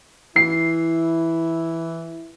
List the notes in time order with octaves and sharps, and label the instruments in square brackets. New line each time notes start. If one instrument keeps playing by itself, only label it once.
[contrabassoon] E3 [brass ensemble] E4 [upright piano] C7